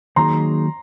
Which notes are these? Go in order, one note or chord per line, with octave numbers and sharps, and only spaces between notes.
D#3 F#3 A#3 D#4 G#4 A#5 C6